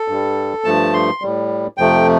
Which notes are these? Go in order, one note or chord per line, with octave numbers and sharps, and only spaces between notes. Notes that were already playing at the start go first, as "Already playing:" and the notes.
Already playing: A4
G2 G3
G2 F3 A3 A5
C6
A2 G3
F2 C3 F3 A3 G5